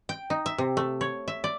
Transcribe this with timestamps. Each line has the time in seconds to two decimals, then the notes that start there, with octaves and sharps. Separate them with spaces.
0.09 G5
0.30 D#4
0.46 E5
0.58 C3
0.77 A3
1.01 C#5
1.28 E5
1.44 D5